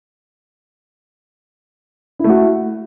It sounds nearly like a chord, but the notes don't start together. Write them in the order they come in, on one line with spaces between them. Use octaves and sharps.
E4 A3 F#4